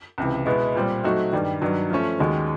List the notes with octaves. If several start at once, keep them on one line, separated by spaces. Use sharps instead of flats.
C#2 C3 E3
B2 G#3 B3 E4
A#2 G3 C4
F#3 A3 C4 D#4 F#4
G2 D#3 G3
G2 D#3 F#3
F3 A3 C#4
D#2 D#3 G#3 C#4 F#4